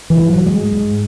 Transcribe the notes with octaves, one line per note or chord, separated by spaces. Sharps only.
E3
G#2
F#3
G#2 G#3
G#2